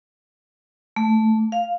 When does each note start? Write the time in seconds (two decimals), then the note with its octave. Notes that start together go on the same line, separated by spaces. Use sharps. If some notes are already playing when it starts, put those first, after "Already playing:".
0.96 A3
1.52 F5